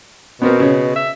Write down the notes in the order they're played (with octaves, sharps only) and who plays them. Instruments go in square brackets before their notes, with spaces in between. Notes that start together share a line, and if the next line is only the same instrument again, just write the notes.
[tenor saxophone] B2 [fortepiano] B3 C4 A#4
[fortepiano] C#3 C#5
[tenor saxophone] E5